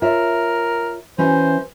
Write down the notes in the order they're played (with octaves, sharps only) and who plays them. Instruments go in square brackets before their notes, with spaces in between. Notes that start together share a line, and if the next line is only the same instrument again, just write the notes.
[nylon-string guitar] F4 C#5 E5 [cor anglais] A#4
[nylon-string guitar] E3 C#4 F#4 [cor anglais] C5